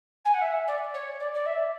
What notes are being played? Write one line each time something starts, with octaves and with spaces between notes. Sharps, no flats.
G#5
F#5
E5
D5
C#5
D5
D5
E5